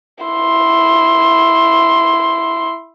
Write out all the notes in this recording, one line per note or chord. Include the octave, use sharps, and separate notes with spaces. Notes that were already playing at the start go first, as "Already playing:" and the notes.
E4 C6